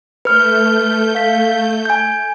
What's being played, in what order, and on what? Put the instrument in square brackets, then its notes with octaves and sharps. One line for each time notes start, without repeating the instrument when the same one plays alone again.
[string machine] A3 G6 [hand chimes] B4 F6
[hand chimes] F5 B6
G#5 G6